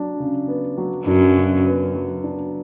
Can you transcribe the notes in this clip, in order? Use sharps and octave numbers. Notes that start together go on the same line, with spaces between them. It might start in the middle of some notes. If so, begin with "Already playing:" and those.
Already playing: F#3 D4
C#3
B3
F#3
F#2 D4
C#3
B3
F#3
D4